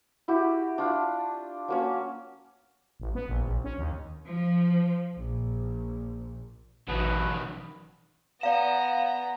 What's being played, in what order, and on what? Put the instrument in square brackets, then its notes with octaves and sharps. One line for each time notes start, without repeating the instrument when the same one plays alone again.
[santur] E4 F#4 G4
D4 F4
F#3 A#3 C#4
[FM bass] A1
B3
A#1
A#1
C#4
D#2
[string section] F3
A#1
[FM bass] A1 [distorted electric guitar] B2 D#3 [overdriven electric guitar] E3 F#3 [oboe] B4
[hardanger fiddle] B3 A#5 [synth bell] D5 F5 E7